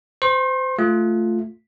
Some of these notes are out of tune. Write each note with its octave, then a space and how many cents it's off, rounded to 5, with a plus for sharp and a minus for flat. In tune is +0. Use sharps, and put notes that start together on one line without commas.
C5 -25 C6 +40
A3 +0 F4 +0